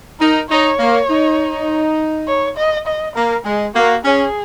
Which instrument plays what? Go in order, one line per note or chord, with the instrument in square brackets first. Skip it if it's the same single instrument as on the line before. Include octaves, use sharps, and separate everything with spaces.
[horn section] D#4 [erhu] A#4
[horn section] D#4 [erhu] C#5
[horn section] A#3
D#4
[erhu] C#5
D#5
D#5
[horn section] A#3 [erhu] A#4
[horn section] G#3 [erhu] G#4
[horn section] A#3 [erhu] F#4
[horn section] C#4 [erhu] G#4